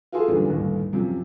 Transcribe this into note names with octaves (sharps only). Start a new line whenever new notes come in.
F4 F#4 G#4 A4 C6
F#2 A#2 D3 E3 G3
G1 D#2 A2
F#2 C3 F3 F#3